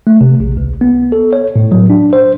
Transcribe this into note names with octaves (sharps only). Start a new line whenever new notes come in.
A3
C3
A#1
C#2
B3
A4
C#5
A2
F#3
D4
C5